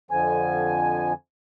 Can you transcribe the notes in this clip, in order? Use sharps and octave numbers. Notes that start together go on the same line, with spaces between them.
F2 D3 F3 G#5